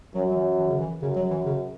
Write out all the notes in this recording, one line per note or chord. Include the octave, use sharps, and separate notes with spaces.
F#2 F#3
F#3
E3
E3
C#3
E3
F#2 C#3
F#3
E3
C#3